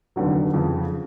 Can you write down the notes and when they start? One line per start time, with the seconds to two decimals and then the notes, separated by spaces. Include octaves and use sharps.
0.16 F1 D#2 D3 F#3
0.53 F2 C#3 F3